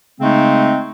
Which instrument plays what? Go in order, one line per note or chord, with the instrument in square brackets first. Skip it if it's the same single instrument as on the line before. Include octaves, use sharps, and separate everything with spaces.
[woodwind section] C#3 G#3 A3 C4 D#4